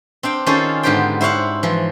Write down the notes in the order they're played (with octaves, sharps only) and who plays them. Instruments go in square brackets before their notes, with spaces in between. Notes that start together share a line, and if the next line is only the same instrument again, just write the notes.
[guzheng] C4 D4 F5 G5
D#3 C#4 F4 G#4 A4 C5
G#2 D3 B3 G4 C5 G5
E4 C5 C#5 F5 F#5
E3 F3